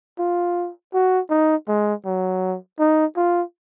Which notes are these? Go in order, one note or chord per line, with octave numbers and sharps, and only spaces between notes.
F4
F#4
D#4
G#3
F#3
D#4
F4